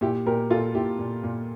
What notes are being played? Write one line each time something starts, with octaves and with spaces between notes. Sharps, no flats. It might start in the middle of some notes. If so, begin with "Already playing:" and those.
A#2 E4 G4
A#2 G4 A#4
A#2 F4 A4
A#2 E4 G4
A#2
A#2